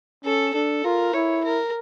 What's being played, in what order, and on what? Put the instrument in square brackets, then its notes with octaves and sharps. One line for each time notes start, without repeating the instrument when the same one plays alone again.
[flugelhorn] C#4 [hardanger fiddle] A4
[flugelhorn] D4 [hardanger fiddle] A4
[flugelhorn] F4 [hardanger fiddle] A#4
[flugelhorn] E4 [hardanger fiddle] C#5
[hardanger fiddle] A#4